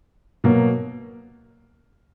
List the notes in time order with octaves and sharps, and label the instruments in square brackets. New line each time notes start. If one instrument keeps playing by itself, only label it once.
[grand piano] B2 F#3 A#3